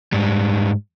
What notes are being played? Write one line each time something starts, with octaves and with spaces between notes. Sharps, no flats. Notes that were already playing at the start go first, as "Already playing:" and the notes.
G#2 G3